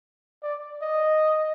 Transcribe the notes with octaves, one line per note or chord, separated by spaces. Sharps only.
D5
D#5